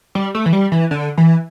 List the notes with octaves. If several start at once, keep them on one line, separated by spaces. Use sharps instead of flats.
G3
A3
E3
G3
E3
D3
E3